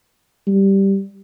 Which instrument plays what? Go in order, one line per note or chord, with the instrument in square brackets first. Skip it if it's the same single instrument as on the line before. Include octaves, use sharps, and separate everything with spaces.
[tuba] G3